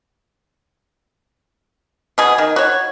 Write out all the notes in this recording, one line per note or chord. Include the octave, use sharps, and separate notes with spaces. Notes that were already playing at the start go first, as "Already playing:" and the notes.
B2 G#4
D#3
F#4 C#5